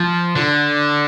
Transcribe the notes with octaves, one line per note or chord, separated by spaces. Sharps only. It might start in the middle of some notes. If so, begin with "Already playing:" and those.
Already playing: F3
D3